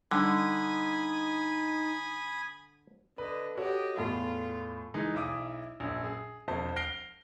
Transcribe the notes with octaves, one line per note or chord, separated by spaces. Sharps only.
D3 G3 D4 D#4 G#5 B5 D#6
D3 B4 D#5
F#4 G4 A4 C#5 D#5
E2 A2 F4 A4
E3 G#3 D#4
B1 E4 E5 D6 D#6
A#1 F#2
G#4
E1 F2 C5 A5
F6 A#6 C7 D7 G7